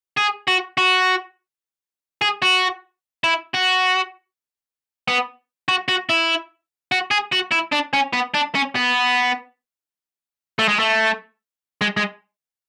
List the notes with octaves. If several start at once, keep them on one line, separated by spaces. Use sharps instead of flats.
G#4
F#4
F#4
G#4
F#4
E4
F#4
B3
F#4
F#4
E4
F#4
G#4
F#4
E4
D4
C#4
B3
D4
C#4
B3
A3
G#3
A3
G#3
G#3